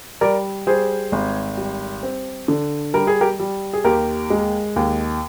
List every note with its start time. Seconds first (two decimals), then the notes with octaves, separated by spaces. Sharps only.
0.21 G3 A#4 D5
0.67 G3 G#4 C5
1.12 G#1
1.57 G3
2.03 C4
2.48 D3
2.94 G3 A#4
3.07 G#4
3.21 G4 A#4
3.39 G3
3.73 G#4
3.84 D#2 G4 A#4
4.30 G#3
4.76 D#2